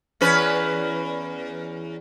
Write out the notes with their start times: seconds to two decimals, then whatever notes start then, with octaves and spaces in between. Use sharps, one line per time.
0.21 E2 C#4 B4